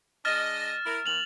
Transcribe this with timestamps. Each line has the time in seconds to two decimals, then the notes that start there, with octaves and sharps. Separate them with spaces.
0.25 G#3 D4 D#5 F6 A6 E7
0.85 E4 A#4
1.06 D#2 F7 F#7